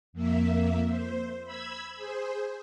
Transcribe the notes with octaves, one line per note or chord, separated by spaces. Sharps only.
F2 A#3 E5
C5
B5 E6 G#6
G#4 C5